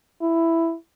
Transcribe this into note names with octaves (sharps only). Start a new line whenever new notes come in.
E4